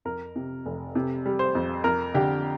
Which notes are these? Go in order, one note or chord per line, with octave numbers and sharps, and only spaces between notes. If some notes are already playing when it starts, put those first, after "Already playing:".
F2 A#4
C3
F1
C3
G3
C5
F2
F2 A#4
D3 G4